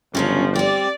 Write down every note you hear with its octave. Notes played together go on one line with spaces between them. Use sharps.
G1 C#3 F3 F#3 C#4
G3 C4 D5